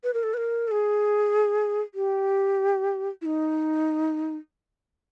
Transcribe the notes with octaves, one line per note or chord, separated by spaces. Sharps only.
B4
A#4
A4
B4
A#4
A4
G#4
G4
E4
D#4